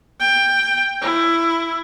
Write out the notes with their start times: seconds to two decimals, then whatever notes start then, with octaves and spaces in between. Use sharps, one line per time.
0.20 G5
1.01 E4